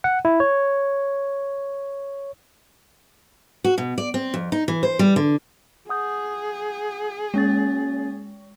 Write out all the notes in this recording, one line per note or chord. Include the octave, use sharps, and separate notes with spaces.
F#5
E4
C#5
F#4
B2
D5
C4
F2
D#4
E3
C5
G3
D3
G#4 F#5 D#6 G6
G#3 A#3 C#4 A6